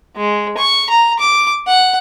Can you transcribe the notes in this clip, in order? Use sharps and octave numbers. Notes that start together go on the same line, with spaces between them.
G#3
C#6
A#5
D6
F#5